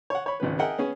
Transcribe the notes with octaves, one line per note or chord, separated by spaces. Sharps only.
C#5 F#5
C#5 B5
G#1 C#2 F3 B4
G#4 A#4 D#5 E5 F#5 G5
B3 C#4 G#4